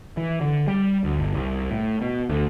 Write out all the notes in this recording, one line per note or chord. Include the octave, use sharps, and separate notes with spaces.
E3
D3
G3
D2
G1
C2
A2
B2
D2